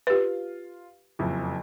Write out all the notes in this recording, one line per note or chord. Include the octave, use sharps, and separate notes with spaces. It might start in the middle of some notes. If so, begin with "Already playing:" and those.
F4 G4 B4 F5
F#1 F2 E4